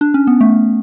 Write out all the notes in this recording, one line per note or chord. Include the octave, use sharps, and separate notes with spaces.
D4
C#4
B3
A3